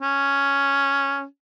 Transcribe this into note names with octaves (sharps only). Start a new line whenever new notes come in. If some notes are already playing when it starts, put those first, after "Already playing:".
C#4